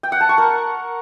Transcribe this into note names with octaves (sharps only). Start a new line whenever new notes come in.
G5
F#5
A5
C#6
A#4